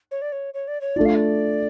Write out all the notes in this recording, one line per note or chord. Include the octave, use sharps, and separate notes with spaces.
C#5
D5
C#5
C#5
D5
C#5
A3 D4 F4 D5
F5
D5